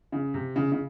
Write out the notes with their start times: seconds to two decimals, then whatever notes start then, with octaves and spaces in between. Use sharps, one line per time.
0.12 C#3
0.34 C3
0.56 C#3
0.72 C#3